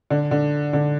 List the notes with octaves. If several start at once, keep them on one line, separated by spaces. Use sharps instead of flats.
D3
D3
D3